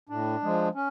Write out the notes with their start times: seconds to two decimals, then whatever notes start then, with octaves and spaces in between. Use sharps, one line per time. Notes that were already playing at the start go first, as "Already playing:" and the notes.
0.09 A2 D4
0.42 F3 G#3
0.75 C#4